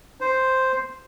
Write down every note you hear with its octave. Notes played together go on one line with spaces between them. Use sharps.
C5